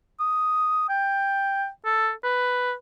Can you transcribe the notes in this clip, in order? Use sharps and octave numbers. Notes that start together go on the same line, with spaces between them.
D#6
G5
A4
B4